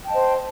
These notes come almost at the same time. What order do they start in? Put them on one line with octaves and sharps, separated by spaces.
G5 A5 D#5 C5